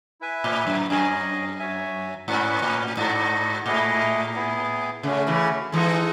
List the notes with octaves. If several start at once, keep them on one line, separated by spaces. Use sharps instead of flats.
E4 B4 E5 G#5
A2
F#2
F#2 C#4 G#4 D#5 G#5
F#4 C#5 E5 G#5
G#2 C#4 F#4 B4 F#5
A2
G#2 D#4 F#4 A4 D#5 F#5
A2 A3 E4 G#4 D#5 F#5
B3 E4 G#4
C#3 A3 C#4 F#4
C#3 E3
E3 G#3 D#4 A4 D#5 F#5